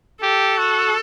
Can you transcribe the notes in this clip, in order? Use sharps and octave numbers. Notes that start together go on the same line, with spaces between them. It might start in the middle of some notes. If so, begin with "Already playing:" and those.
G4 A4
F#4